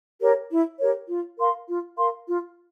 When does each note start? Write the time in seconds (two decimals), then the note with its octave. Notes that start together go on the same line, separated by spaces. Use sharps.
0.20 G4 A#4 C#5
0.50 E4
0.79 G4 A#4 C#5
1.09 F4
1.38 A#4 F5 C6
1.68 F4
1.98 A#4 F5 C6
2.27 F4